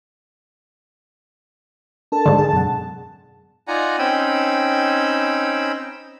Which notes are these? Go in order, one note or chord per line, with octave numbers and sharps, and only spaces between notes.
D4 A4 A#4 A5
G#2 D3
G#4
F#2 B2 F#5
D#4 F4 D5 F#5 G#5 A#5
C4 C#4 D#4 G5 B5 E6